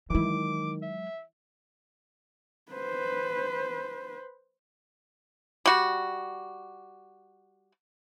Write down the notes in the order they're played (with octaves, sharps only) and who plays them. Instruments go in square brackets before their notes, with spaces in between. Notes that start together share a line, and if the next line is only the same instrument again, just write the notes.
[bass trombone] D#3 [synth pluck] E3 E4 [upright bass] F#3 G#3 [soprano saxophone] D6
[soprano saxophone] E5
[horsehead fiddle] B4 C5
[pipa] G3 F#4